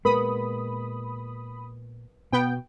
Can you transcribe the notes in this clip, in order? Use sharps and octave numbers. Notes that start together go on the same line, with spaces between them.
A#2 G#3 B3 A#4 B4 B5 D#6
B2 B3 G5